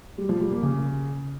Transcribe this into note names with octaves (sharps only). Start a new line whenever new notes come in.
G3
F3
G3
A#3
C#3